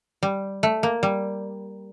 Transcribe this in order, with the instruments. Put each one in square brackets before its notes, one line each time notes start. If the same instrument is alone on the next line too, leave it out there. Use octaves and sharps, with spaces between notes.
[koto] G3
A3
A#3
G3